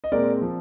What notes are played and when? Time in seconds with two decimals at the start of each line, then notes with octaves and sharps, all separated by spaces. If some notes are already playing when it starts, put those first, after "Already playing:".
0.04 D#5
0.12 A#2 G#3 C4 A#4 D5
0.42 F3 C4